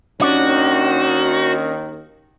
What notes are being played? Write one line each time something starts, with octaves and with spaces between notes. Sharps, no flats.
D#2 D#3 C#4 D4 F#4 D5